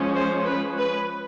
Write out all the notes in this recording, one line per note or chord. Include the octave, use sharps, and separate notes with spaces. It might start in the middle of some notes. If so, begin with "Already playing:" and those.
Already playing: F3 G#3 C#4
C5
B4
B4